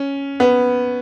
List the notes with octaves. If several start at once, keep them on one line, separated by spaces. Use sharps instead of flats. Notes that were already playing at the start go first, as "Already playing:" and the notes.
Already playing: C#4
B3